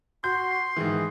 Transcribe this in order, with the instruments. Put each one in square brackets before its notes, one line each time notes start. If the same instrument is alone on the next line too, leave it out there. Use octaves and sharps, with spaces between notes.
[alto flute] F#4 [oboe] C6 [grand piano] G6
[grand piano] G#2 D#3 E3 [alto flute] G#4